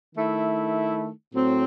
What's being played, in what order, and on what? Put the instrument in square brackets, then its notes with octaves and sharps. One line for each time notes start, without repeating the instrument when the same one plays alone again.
[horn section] D#3 A3 E4
A2 F#3 C4